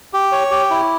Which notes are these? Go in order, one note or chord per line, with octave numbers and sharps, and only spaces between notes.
G4
C#5
G4
E4